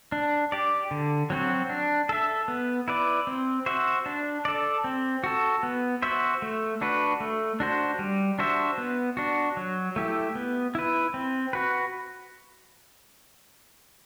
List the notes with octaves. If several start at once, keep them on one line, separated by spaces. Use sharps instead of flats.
D4
G4 D5
D3
F#3 C4 F#4
D4
A4 E5
B3
E4 B4 D5
C4
F#4 C5 E5
D4
A4 D5
C4
F#4 A4
B3
F#4 C5 E5
A3
D4 F#4 B4
A3
D4 F#4 C5
G3
D4 F#4 C5 E5
B3
D4 F#4
F#3
A3 E4 G4
B3
E4 B4
C4
F#4 B4